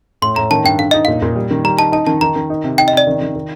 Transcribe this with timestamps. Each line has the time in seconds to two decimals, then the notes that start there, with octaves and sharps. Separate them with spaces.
0.22 A2 C6
0.36 A2 A#5
0.51 D#3 A5
0.64 G2 G5
0.79 D3 F5
0.91 D#4 D#5
1.05 A#2 F5
1.22 A#2
1.36 G3
1.51 D#3
1.64 G3 A#5
1.78 D#4 A5
1.92 D#4 A5
2.07 D#3 A5
2.21 D#3 A#5
2.36 D#3
2.50 D#4
2.64 C3
2.78 D#4 G5
2.88 D#5
2.93 C3 D5
3.07 D#3
3.21 D#3
3.36 D#3